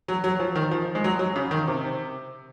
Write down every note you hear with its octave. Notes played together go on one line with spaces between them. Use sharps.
F#3
F#3
F3
D#3
F3
G#3
F#3
F#3
C#3
D#3
C3